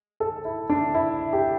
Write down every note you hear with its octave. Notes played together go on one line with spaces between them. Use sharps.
A4
E4
D4
E4
G4